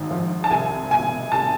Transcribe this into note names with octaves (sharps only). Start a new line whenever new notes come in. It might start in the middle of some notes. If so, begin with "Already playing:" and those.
Already playing: G#1 G#2
F3
A5
C2 G#5
B2 G#5
C2 A5